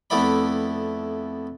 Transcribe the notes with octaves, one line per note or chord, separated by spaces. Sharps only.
F2 A3 B3 E4 D5 B5